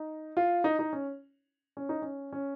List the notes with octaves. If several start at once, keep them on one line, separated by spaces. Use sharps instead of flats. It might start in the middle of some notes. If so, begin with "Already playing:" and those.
Already playing: D#4
F4
D#4
D#4
C#4
C#4
D#4
C#4
C#4